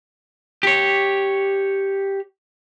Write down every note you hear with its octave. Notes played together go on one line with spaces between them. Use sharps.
G4 C#5